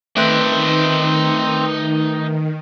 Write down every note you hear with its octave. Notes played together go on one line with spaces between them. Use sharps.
D#3 A3 C4 D#4 B4 D5